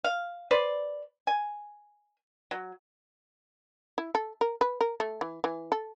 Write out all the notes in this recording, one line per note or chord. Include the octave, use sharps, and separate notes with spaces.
F5
B4 C5 D5
G#5
F#3
E4
A4
A#4
B4
A#4
A3
E3
E3
A4